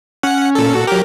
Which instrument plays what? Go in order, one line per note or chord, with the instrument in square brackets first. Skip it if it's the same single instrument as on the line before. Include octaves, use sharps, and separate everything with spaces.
[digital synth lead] C#4 [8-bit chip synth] F#5
[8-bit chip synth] A#2 A4
[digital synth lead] F#4
[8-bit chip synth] F#3 G4 [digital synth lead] A#4